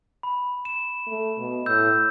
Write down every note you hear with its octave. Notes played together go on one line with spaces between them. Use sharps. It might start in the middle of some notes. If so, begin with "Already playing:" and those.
B5
E7
A3
B2
A2 E6 G6